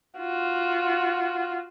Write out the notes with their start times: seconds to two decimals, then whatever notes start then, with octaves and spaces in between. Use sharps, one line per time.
0.18 F4 F#4